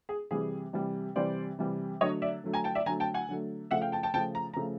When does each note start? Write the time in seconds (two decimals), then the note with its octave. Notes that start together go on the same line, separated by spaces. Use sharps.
0.09 G#4
0.31 C3 E3 G3 G#4
0.73 C3 E3 G3
1.16 C3 E3 G3 C5 D5
1.59 C3 E3 G3
2.01 D3 F#3 A3 C#5 D#5
2.22 D5 E5
2.44 D3 F#3 A3
2.54 G#5 A#5
2.64 G5 A5
2.75 D5 E5
2.86 D3 F#3 A3 G#5 A#5
3.00 G5 A5
3.14 F#5 G#5
3.29 D3 F#3 A3
3.71 C#3 F3 A3 E5 F#5
3.81 F5 G5
3.92 G5 A5
4.03 G5 A5
4.14 C#3 F3 A3 G5 A5
4.35 A#5
4.54 C#3 F3 A3 A#5